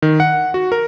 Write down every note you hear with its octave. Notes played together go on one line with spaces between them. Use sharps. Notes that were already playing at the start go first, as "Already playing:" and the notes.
D#3
F#5
F#4
A#4